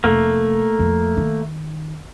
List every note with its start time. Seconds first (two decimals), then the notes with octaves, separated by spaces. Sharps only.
0.04 F1 A3 A#3
0.79 F2
1.17 D#3